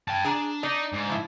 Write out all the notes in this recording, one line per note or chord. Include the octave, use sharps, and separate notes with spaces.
G5 A5
D4 G#4 G#5 A#5
D4 D#4 D5
G#2
F3 E4